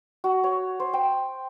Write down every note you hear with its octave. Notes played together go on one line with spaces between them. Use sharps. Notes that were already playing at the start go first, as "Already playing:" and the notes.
F#4
C#5
C5
G5